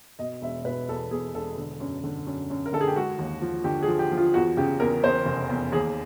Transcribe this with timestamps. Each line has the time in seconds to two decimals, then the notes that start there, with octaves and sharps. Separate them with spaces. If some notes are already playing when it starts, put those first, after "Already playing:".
0.19 B2 D#5
0.42 E1 E5
0.65 B2 B4
0.89 E2 A4
1.11 E2 G#4
1.34 E1 A4
1.57 D3
1.80 F#2
2.04 D3
2.27 F#2
2.50 F#2
2.66 A#4
2.72 D3 A4
2.81 G#4
2.88 G4
2.95 G#3 F#4
3.19 D#2
3.42 F3
3.64 D3 G4
3.83 G#4
3.88 F3
3.99 G4
4.11 F3
4.17 F4
4.34 E2 F#4
4.57 C#3 G4
4.80 E2 A#4
5.03 E2 C5
5.26 F1
5.49 E2
5.72 D#2 G#4